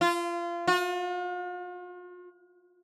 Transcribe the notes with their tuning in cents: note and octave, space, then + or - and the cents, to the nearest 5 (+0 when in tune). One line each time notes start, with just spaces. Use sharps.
F4 -25
F4 +45